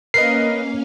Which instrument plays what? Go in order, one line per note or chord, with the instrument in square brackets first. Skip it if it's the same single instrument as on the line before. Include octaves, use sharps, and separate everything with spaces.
[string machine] A#3 C#4 F5 [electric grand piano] A#4 B4 D#5 [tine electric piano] C7